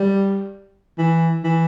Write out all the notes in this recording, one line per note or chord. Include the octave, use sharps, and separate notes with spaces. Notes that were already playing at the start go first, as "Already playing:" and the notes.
Already playing: G3
E3
E3